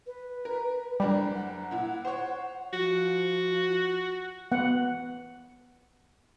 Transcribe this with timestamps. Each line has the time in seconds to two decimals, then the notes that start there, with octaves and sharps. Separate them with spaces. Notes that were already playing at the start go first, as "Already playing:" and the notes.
0.06 B4
0.45 A#4
1.00 F#1 G3 D4 A#4
1.35 F#5
1.71 A#2 E4
2.05 C5 C#5
2.73 F3 F#4
4.52 B3 F#5